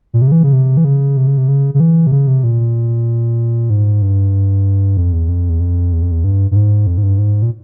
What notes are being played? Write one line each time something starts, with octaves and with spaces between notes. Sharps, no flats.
A#2
C3
C#3
E3
C#3
C3
E3
C#3
C3
C#3
C3
C#3
C#3
E3
C3
C#3
C3
A#2
G#2
G2
F2
E2
F2
E2
F2
E2
F2
E2
G2
G2
G#2
F2
G#2
G2
G#2
A#2